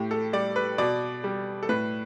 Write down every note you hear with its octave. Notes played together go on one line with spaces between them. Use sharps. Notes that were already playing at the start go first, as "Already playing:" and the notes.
Already playing: A2 G4
A4
G3 D5
B4
B2 D5
G3
A4
A2 B4